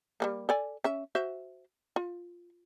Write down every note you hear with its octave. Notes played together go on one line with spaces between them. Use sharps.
G3 A3 A#3
A4 D5 G#5
C#4 E5
F#4 C5 E5
F4